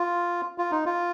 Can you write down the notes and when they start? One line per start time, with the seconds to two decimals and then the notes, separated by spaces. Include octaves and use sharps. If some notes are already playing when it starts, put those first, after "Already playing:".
Already playing: F4
0.58 F4
0.71 D#4
0.86 F4